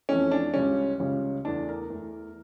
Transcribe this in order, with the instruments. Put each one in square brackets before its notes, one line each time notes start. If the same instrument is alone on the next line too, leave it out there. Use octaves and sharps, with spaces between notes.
[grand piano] F2 E3 A3 C#4
D4
C#2 C#3 G3 C#4
C#2 C#3 G3 C#4
E2 E3 A3 D4
A#4
E2 E3 A3